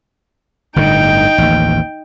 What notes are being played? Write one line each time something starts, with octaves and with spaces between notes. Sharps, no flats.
G1 A2 D3 D#4 G5
A1 D#2